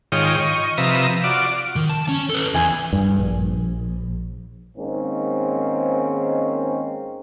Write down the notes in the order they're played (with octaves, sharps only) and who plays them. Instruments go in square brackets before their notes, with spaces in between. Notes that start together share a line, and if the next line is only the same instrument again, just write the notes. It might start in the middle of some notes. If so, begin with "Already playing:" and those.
[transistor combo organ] G#2 D#3 F4 C#5 G5 D#6
D#5 C#6
C3 F3 B4 E5 A#5 D#6
F4 F#4 D5 D6
[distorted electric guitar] D#3
A5
C#4
A4 B4
[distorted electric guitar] E2 [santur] G#5
[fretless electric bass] G2
A#1
[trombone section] G#2 D#3 G#3 A#3 C4 C#4